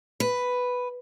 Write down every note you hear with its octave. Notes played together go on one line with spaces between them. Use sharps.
B4